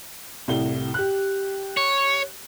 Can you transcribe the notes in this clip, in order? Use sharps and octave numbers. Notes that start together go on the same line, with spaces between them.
C2 A2 G7
G4 F#6
C#5